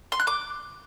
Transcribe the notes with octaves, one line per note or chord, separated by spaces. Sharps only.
C6
F#6
D6